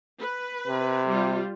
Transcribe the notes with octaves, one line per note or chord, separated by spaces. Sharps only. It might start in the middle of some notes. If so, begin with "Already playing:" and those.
B4
C3
G3 F4